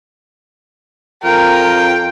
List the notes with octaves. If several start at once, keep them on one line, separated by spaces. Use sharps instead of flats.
F2 F4 A#4 G5